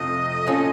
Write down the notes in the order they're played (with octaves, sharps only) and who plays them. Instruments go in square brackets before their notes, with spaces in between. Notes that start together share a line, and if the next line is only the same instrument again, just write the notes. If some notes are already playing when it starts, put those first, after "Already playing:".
Already playing: [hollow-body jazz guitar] F2 C3 F3 A3 [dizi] D#5
[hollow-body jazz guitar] A#2 A3 C#4 F4 A4